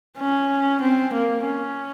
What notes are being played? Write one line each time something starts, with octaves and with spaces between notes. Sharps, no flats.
C#4
C4
A#3
C#4